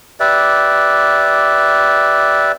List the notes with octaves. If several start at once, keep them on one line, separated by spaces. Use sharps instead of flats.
G4 B4 D5 E5